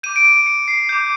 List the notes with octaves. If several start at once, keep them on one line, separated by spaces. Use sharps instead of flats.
D6 G6 D#7
D7
D#7
C#7
C7
D6 G6